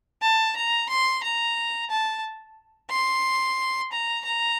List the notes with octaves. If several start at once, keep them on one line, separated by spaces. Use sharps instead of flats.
A5
A#5
C6
A#5
A5
C6
A#5
A#5